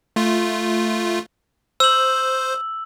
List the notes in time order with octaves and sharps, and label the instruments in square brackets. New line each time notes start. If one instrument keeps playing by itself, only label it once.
[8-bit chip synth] A3 F4
[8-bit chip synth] C5 [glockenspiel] E6 F#7